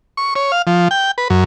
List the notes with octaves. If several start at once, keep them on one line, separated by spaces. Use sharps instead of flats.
C#6
C#5
F5
F3
G5
B4
F#2